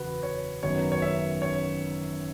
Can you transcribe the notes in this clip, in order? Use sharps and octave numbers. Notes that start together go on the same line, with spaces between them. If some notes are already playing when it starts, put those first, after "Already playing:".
Already playing: F#1 E2 F#4 B4
C#5
G#1 F#2 F#3 B3 C#5
C#5
E5
C#5